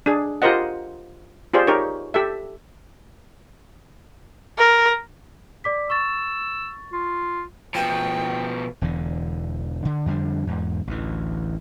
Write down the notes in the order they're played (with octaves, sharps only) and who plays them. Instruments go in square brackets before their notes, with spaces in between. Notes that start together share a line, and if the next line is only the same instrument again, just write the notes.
[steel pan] D4 G#4
F4 G4 A#4 C5 D#5 F#5
F4 G4 G#4 C5 D5
D#4 G4 A#4 C#5
G4 A4 E5
[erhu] A#4
[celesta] D5 D6 B6
[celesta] C#6 A6 [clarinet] E6
[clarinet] F4
[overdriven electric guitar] B2 F3 [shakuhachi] G5
[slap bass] E1 E2 D3
D3
F2 D3 G3 D4
E2 G#2
A1 D2 E3